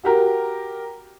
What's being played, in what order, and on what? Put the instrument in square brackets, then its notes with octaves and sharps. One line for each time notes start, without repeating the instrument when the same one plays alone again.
[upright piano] F#4 G4 A#4